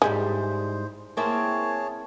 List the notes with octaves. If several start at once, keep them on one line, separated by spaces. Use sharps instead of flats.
G#2 G3 G#3 E4 C5
A#3 C4 E4 G#4 C#5 A5